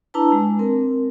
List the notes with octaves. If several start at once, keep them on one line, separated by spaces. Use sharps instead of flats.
D4 E4 B4 A5 A#5
G#3
C4 A#4